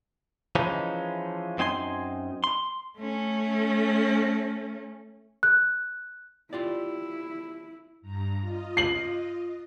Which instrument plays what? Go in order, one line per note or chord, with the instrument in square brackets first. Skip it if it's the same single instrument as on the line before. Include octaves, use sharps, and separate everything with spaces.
[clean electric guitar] E3 F3 G#3 C#4 D#4
F#2 C4 D#4 G#5 C6
C6
[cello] A3 C#4
[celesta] F#6
[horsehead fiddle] E4 [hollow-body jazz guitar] F4 G4 D5
[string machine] G2 A#5
F4 D#5
[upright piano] C7 F#7